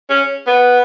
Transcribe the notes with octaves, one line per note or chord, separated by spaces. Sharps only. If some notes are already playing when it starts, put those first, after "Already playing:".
C#4
B3